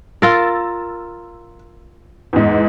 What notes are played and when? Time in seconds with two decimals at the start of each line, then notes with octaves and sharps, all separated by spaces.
0.22 F4 A#4 E6 A6
2.33 E2 G#2